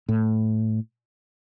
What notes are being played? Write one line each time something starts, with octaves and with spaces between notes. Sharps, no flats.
A2